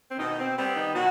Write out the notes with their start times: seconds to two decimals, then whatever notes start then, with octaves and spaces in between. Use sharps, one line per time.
0.10 C4
0.18 B2 D#3 D#4
0.38 C4
0.56 G3 B3 C4
0.75 D#3 D#4
0.94 B2 F#3 F#4